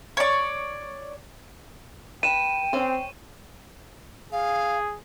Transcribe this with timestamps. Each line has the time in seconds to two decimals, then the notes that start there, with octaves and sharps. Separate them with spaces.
0.17 C#5 D5
2.23 B4 G5 D#7 E7
2.73 C4 C#4 C5
4.32 G#4 F5